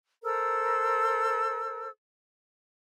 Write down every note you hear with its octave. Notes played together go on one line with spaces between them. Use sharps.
A4 A#4 C5 E6